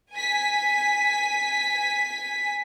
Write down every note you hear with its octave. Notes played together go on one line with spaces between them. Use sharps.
G#5 B6